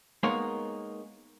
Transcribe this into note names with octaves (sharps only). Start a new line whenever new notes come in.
G#3 A#3 B3 D#4 A#4 C#5